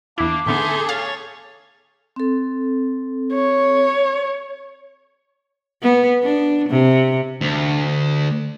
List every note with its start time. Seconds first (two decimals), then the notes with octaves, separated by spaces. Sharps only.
0.18 E2 A#3 D4 E4 D6
0.47 A2 D3 B3 D#4 G#4 A4 E5 C6
0.89 C#5 F5 C#6 A6
2.16 C4 A4
3.33 C#5
5.83 B3
6.23 D4
6.69 C3
7.41 D2